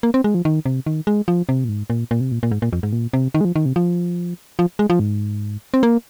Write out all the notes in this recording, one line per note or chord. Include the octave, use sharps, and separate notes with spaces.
A#3
C4
G#3
F3
D#3
C3
D#3
G#3
F3
C3
A#2
G#2
A#2
A#2
C3
A#2
A#2
G#2
A#2
F2
G#2
A#2
C3
D#3
G#3
F3
D#3
C3
F3
F3
G#3
F3
G#2
C4
A#3